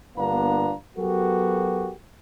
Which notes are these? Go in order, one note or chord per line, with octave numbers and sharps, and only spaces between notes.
G1 A#3 B3 D4 F5 A#5
F#3 B3 F#4 G4 A4 A#4